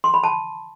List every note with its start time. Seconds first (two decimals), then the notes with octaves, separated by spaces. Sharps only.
0.04 C6
0.14 B5
0.24 A5